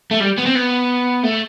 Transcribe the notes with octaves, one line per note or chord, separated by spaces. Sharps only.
A3
G3
B3
C4
B3
A3